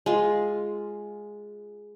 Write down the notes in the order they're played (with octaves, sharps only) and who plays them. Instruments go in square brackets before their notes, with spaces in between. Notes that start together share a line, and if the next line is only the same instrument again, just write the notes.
[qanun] G#3 F4